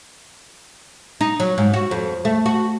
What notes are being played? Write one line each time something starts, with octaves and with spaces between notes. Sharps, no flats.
D#4
F#3
G#2
F#4
F2
A3
F#4